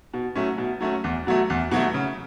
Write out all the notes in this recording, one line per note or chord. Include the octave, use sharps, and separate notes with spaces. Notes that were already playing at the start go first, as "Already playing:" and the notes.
B2
F#3 A3 C#4
B2
F#3 A3 C#4
E2
B2 F#3 A3
E2
B2 F#3 A3
C#3